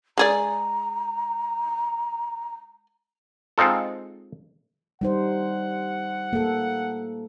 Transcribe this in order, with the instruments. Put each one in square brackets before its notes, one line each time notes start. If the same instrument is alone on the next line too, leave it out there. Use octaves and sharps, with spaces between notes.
[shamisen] G#3 G#4 D5 [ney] A#5
[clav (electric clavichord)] G#3 C4 D#4 F4 A4
[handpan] G3 D#4 C5 [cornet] F#5
[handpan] A#3 A4